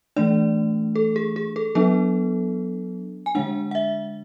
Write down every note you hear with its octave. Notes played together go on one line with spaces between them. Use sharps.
E3 A3 D4 D5
A4
G#4
G#4
A4
F#3 B3 D4 A4
G#5
D3 G#3 D4 F#5
F#5
E5